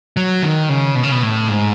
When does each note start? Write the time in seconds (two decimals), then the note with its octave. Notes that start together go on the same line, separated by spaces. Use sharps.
0.17 F#3
0.43 D#3
0.69 C#3
0.95 B2
1.03 C#3
1.12 B2
1.22 A2
1.48 G#2